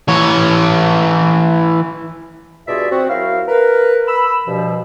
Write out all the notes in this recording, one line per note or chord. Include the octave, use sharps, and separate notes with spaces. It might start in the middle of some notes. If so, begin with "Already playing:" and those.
E3 C#5
G2 B2 F4 G#4 D5 E5
C4 F#4
F#3 E4 A#4 C5 F5
A#4 B4
B5 E6
G2 B2 F3